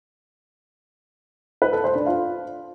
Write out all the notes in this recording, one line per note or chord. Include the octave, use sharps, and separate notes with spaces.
B4
A4
C5
D4
F4